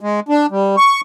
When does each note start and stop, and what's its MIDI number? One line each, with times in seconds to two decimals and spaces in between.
0.01 0.20 56
0.29 0.46 62
0.51 0.76 55
0.77 1.01 85